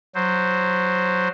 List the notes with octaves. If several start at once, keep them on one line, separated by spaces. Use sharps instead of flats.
F#3 C5